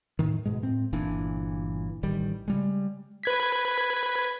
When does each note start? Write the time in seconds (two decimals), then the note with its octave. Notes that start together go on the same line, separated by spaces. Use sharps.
0.19 A2 D#3
0.45 G#2 B2 G#3
0.62 A2 C4
0.93 G1 A#2 E3 D4
2.03 A1 D#3 G3
2.48 C#3 G3 G#3
3.23 B4 G#6 B6